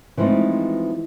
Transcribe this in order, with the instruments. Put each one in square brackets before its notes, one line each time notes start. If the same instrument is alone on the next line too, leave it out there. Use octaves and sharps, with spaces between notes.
[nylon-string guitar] E3 F3 G#3 A3 C4 D#4